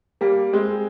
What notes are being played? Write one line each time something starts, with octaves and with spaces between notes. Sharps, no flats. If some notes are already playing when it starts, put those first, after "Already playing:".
G3 A#3
G#3 C4